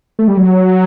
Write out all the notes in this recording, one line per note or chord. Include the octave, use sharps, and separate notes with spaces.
A3
G3
F#3